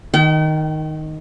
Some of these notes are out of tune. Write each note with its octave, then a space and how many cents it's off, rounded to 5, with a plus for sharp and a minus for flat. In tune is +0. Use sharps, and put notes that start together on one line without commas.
D#3 +0 G5 -45